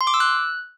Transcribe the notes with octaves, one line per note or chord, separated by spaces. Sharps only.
C6
D6
E6
F#6